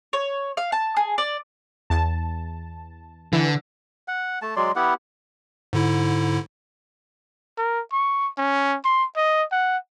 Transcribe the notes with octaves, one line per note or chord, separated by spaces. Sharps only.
C#5
F5
A5
G#4
D5
E2 A5
D3 E3
F#5
A3 A5
F#3 G#3 D5 C6
B3 E4 G4 F#5
G#2 D3 E4
A#4
C#6
C#4
C6
D#5
F#5